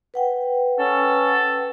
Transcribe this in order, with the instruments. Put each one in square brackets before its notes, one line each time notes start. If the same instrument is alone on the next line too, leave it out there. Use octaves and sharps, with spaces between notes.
[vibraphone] B4 F#5 G5
[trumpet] C#4 [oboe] A4